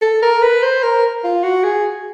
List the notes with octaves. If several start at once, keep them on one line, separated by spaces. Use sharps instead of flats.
A4
A#4
B4
C5
A#4
F4
F#4
G#4